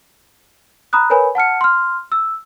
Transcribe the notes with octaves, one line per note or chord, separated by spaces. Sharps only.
A#5 B5 D#6 F#6
A#4 B4 C#5 G#5 B5
F#5 A5 F6 C#7
C6 F6
E6